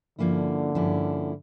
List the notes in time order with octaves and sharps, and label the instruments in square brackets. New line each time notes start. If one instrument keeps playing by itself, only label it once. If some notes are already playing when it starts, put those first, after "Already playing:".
[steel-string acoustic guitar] G2 F3 A#3 C#4 E4 [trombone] D3
[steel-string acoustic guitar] G2 F3 A#3 C#4 E4